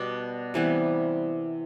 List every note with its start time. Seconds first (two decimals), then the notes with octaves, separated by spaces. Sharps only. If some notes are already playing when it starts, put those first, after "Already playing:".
Already playing: B2 G3 B3 D4
0.54 C3 E3 G3 B3